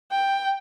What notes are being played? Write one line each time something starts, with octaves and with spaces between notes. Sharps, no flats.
G5